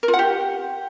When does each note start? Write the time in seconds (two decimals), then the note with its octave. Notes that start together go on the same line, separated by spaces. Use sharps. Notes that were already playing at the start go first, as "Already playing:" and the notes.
0.03 A#4
0.08 F4
0.13 F#5
0.19 G4